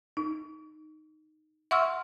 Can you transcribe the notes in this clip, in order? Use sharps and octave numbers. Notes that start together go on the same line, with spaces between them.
D#4
E5 F#5 C6 C#6 E6 F6